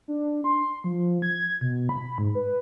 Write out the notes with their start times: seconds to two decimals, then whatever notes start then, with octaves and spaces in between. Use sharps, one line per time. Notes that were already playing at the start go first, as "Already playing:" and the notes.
0.08 D4
0.44 C6
0.84 F3
1.22 G#6
1.61 B2
1.89 B5
2.18 G#2
2.35 B4